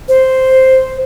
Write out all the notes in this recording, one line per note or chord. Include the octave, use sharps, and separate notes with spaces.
C5